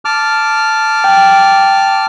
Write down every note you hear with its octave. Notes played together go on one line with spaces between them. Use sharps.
A5 D6 F6
G5